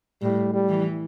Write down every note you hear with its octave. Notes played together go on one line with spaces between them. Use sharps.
A2 G3
G3
E3